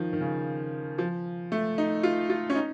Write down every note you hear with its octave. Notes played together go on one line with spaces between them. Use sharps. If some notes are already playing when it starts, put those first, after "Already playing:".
Already playing: D#3 F3
D#3
C#3
F3
A3
D#4
F4
F4
C#4
D#4